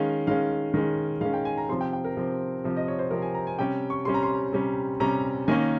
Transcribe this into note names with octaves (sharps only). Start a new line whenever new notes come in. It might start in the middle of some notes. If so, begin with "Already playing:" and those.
Already playing: D#3 G#3 C#4 F5
D#3 G#3 C#4 F5
D#3 G#3 C#4
D#3 G#3 C#4 F5
G5
G#5
A#5
C3 F3 C4 C6
G5
G5
A#4
C3 F3 C4
C3 F3 C4
D#5
C#5
C5
C3 F3 C4 A#4
G#5
A#5
G#5
C3 G3 C#4 G5
C#6
C3 G3 C#4 C6
A#5
C6
C3 G3 C#4
C3 G3 C#4 A#5
D#3 A#3 C#4 G#5